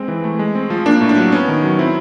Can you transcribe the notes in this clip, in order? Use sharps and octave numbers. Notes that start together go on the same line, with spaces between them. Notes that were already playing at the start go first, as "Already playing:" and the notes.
Already playing: G#3 C4
E3
A3
G#3
C4
F3
A#3 D4
A2
D4
F#3
B3 C#4
D#3
F#3
C4 E4